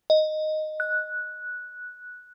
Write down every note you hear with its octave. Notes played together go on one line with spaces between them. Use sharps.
D#5
F#6